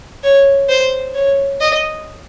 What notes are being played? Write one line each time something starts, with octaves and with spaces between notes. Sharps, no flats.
C#5
C5
C#5
D#5